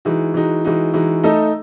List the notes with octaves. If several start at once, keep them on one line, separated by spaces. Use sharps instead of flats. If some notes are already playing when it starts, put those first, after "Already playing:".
E3 G#3 D#4 F#4
E3 G#3 D#4 F#4
E3 G#3 D#4 F#4
E3 G#3 D#4 F#4
A3 D#4 A4 D#5